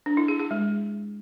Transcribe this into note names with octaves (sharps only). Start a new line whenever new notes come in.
D4
E4
G#4
G#4
G#3